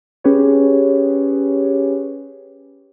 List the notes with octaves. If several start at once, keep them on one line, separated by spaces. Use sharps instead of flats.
C#4 G4 G#4 B4 C#5